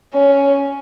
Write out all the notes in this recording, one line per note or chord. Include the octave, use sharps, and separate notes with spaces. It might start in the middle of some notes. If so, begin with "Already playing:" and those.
C#4